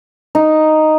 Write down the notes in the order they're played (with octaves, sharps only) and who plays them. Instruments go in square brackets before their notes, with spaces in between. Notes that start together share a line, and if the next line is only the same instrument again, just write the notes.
[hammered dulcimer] D#4